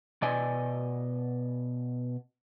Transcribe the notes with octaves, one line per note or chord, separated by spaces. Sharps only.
B2 D5 D#5 G#5